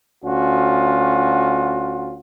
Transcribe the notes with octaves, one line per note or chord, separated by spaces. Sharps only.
D2 C#4 F4 F#4